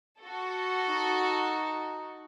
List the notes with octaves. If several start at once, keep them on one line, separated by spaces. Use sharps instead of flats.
F#4 A4
D#4